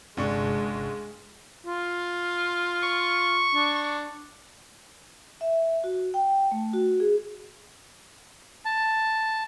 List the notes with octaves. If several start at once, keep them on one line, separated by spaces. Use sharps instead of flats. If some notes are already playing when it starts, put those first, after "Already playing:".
G1 C#2 C3 G#3 D4 C#6
F4
C#6
D4
E5
F#4
G5
A3
F#4
G#4
A5